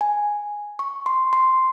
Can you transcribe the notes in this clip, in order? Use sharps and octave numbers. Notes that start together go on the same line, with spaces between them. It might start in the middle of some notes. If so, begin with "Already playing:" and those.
G#5
C#6
C6
C6